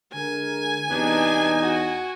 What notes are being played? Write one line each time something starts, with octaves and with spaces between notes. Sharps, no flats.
D3 G#3 A#4 G#5
E2 C3 B3 D4 D#4
F#4